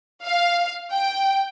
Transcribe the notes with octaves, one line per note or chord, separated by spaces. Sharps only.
F5
G5